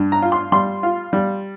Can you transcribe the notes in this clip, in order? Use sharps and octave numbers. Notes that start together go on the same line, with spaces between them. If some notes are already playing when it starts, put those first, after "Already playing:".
Already playing: G2
A#5
F4
C6
G3 C6
F4
G3